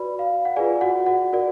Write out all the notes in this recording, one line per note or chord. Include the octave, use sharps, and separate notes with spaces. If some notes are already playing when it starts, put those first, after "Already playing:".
Already playing: F#4 B4 D5 B5
F5
F#5
F4 G#4 B4 D5 G#5
F#4 F#5
F#4 F#5
F#4 A#4 D5